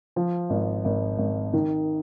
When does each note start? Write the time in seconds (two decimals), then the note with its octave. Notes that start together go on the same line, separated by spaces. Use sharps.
0.16 F3
0.50 G#1
0.85 G#1
1.18 G#1
1.53 D#3